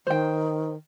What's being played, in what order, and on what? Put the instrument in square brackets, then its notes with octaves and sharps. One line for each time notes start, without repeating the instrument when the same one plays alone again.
[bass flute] D#3 [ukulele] C5 G5